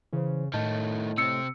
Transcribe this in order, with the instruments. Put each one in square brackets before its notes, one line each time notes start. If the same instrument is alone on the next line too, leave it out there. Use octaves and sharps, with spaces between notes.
[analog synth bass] C#3 [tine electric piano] E3 C5
[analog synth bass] A2 [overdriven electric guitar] D#3 A3 [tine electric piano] D#5 A5 G6
[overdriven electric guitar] C3 C4 [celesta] E6 C#7